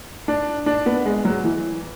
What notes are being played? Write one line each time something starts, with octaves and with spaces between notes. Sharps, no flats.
D4
D4
B3
G#3
F#3
E3